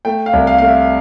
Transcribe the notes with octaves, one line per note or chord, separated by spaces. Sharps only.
A3 G5
F5
C2
F5
A3 F5
E5